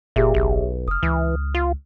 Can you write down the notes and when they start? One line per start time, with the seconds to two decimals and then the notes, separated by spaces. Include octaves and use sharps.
0.16 F#1 A#2 G4 G#4 E5
0.34 B1
0.88 F1 D#6 F6
1.03 C#2 E3
1.54 F4